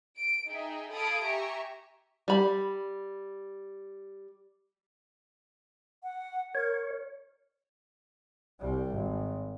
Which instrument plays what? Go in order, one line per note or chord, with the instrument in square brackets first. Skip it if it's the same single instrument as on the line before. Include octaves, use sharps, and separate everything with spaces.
[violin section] D7
D#4 G#4 E5 G5
A4 F5 B5 D#6 G#6 D7
G4 E5 G#5 A#5 C#6
[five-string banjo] G3 B5
[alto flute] F#5
[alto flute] A#4 [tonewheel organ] C#5
[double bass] C2 G3
G#1